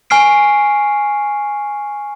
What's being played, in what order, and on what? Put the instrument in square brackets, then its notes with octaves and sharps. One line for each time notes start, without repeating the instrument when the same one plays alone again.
[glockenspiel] G#5 C#6 F6 C7 D7